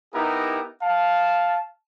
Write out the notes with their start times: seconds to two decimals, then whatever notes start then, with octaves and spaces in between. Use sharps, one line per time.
0.14 B3 D#4 E4 G4 A#4
0.82 F5 A5